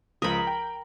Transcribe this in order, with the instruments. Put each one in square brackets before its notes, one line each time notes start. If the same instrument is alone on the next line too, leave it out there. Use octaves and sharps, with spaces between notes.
[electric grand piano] C#2 F3 D#6 [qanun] A#4 B5
[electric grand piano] G5